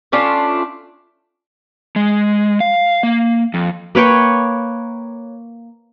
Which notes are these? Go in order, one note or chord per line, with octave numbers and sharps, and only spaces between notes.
A3 C#4 D4 F4
G#3
F5
A#3
F2
A#3 B4 C#5 G5